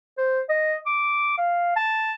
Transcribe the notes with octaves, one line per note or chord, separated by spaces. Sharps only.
C5
D#5
D6
F5
A5